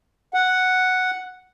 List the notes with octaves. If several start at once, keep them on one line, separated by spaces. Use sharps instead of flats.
F#5